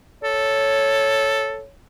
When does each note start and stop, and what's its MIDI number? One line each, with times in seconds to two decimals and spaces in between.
0.24 1.61 69
0.24 1.70 73